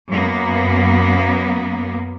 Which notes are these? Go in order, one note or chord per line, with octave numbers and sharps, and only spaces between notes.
F#2 A#3 B3